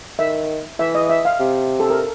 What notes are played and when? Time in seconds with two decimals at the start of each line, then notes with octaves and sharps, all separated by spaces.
0.19 D#3 E5
0.79 E3 E5
0.95 D#5
1.10 E5
1.25 F5
1.40 C3
1.80 A4
1.90 A#4